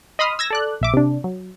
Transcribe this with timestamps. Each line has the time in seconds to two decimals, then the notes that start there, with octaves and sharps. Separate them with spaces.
0.19 D#5 B5 C6 D#6 F6
0.39 E6 G#6 A#6
0.50 A4 D5 F#6
0.81 A#1 E5 D6
0.94 C3 D4
1.24 F#3